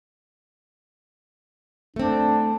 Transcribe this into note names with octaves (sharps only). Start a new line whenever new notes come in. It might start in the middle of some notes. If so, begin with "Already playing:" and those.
A3 C4 D4